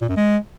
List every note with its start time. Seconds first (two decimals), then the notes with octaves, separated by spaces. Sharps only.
0.01 A#2
0.09 F#2
0.16 G#3